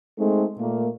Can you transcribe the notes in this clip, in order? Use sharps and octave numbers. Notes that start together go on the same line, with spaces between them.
G#3 A3 C4 D#4 A4
A#2 A3 A#3